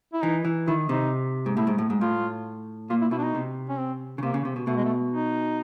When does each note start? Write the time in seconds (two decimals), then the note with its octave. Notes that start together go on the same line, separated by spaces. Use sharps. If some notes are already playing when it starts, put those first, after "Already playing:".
0.13 E4
0.23 E3 D#4
0.45 E3
0.68 D#3 E4
0.89 C3 D#4
1.46 G#2
1.56 A2 E4
1.67 G#2
1.78 A2
1.90 G#2
2.01 A2 F4
2.90 A#2 F4
3.01 E4
3.11 B2 E4
3.18 D4
3.23 D#4
3.35 C3
3.69 C#4
3.78 C4
4.18 C#3
4.23 C3 A#3
4.34 C#3
4.45 C3
4.56 B2
4.67 B2 A3
4.76 G#3
4.85 A3
5.12 D#4